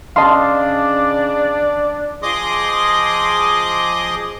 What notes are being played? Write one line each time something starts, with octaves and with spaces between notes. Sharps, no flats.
C#3 D4 D5 D#5 F5 A5 C6
F3 G#4 D#5 C6 D6 D#6